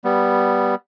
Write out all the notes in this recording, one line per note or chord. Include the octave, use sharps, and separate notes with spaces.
G3 B3